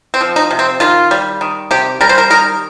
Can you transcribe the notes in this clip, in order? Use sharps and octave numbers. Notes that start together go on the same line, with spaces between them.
C4
F3
D#4
C3
C4
D#3 F4
G3
D#3
C3 G4
G3 A#4
C5
A#4
D#3 A#4